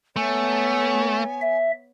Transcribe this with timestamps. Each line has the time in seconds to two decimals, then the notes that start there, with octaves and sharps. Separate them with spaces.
0.16 A3 B3 C#5 G#5
1.41 E5